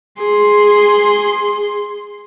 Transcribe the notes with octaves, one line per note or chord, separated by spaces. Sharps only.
G#4 C6